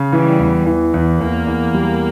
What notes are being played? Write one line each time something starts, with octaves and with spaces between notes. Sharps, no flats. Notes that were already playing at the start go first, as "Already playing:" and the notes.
Already playing: C#3
E3 G3
E2
E3
E2
E2 A#3
E2
G3